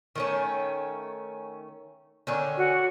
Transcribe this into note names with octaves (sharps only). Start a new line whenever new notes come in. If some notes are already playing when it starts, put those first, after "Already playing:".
D#3 A3 C#4
D3 D#3 C#4
F#4